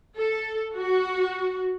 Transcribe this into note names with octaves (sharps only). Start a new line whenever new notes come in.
A4
F#4